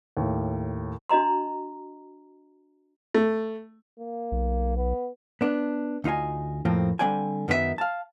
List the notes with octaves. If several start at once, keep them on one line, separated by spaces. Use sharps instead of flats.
D#2 A2
D4 F#4 D#5 A#5 C6
A3
A#3
B1
B3
B3 D4
D2 D#4 F4 D#5 G#5
F2 A2 F3 A#3 C4
D3 G3 C4 D5 G5 G#5
F#2 D#3 B3 D#4 F4 E5
F5 A5